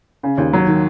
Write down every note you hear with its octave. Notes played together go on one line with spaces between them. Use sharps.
C#3
D#2
F#3
D#3